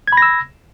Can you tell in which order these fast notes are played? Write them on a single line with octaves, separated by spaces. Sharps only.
G#6 B5 A#6 E6